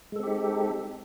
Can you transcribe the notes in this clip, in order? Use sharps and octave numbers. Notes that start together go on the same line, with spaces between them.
G#3 C4 D#4 G4 A4